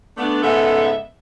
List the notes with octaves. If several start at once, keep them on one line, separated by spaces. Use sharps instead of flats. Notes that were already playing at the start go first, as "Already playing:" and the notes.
A3 B3 D4
G#2 C#3 G#3 B3 A4 E5